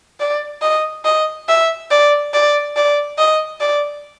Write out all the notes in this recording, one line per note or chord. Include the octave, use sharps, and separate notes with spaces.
D5
D#5
D#5
E5
D5
D5
D5
D#5
D5